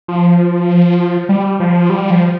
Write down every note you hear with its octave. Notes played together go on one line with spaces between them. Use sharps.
F3
G3
F3
G3
F3